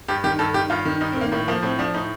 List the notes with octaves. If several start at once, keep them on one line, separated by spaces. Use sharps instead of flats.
G2 G4
D#3 G4
G2 A4
D#3 G4
G2 F4
D#3
G2 D#4
C4
D#3
A#3
A2 A#3
F3 A#3
A2 C4
F3 D4
A2 D#4